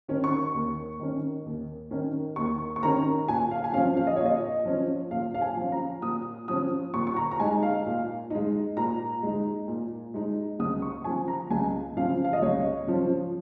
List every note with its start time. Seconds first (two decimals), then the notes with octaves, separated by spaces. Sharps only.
0.08 D#3 C#4
0.24 C#6
0.54 D#2
1.00 D#3 C#4
1.46 D#2
1.91 D#3 C#4
2.36 D#2 C#6
2.76 C#6
2.83 D#3 C#4 A#5
3.28 A#2 G#5
3.51 F5
3.64 G#5
3.74 F3 C#4 F5
3.97 F5
4.07 D#5
4.16 A#2 C#5
4.26 D#5
4.65 F3 C#4
5.11 A#2 F5
5.34 F5
5.41 G#5
5.56 F3 C#4
5.72 A#5
6.02 A#2 D#6
6.48 F3 C#4 D#6
6.94 A#2 C#6
7.07 C#6
7.16 A#5
7.31 A#5
7.40 G#3 D#4 G#5
7.63 F5
7.86 A#2
8.30 G#3 D#4
8.77 A#2 A#5
9.23 G#3 D#4
9.68 A#2
10.14 G#3 D#4
10.59 C#2 D#6
10.82 C#6
11.04 C#3 F3 G#5
11.28 A#5
11.50 C#2 G#5
11.97 C#3 F3 F5
12.24 F5
12.33 D#5
12.42 C#2 C#5
12.87 C#3 F3